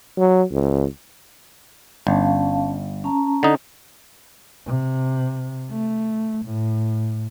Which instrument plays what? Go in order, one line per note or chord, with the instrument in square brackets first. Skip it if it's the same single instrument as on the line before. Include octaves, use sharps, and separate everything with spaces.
[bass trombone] F#3
C#2
[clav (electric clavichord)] G1 [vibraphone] C#4 F5 A5
[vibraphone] C#4 A5 A#5
[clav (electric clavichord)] D3 D#4
[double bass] C3
A3
A2